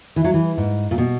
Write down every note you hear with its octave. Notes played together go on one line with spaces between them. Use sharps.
E3
F#3
E3
G#2
A#2
B2